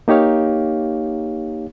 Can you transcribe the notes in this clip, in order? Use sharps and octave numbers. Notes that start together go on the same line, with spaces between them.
A#3 D#4 G4 C#5 F5